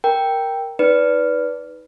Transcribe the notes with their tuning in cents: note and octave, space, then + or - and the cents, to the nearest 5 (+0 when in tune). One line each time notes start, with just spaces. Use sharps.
A#4 +0 G5 +0
D#4 +25 B4 +0 D5 -25